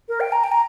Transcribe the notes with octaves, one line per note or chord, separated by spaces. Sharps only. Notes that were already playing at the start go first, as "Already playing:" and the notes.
A#4
G5
A#5
G5
A#5